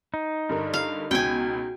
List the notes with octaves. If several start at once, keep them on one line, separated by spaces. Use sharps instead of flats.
D#4
G2 D3 A#4
F5
C#2 B2 F#4 G5 G#5